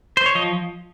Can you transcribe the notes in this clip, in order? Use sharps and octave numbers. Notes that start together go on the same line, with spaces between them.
C5
C#5
F3 D#5